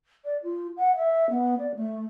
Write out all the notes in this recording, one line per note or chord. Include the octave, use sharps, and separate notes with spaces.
D5
F4
F#5
E5
B3
D5
A3